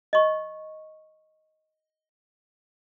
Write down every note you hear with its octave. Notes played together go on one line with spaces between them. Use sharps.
D#5 C#6